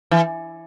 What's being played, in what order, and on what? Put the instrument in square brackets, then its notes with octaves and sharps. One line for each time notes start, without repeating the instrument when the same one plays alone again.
[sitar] E3